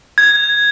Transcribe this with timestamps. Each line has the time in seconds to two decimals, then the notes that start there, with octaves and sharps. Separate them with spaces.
0.18 G#6